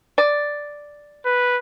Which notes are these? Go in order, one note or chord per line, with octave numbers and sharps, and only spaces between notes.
D5
B4